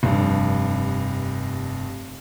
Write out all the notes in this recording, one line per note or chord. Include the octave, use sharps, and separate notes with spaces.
F1 G2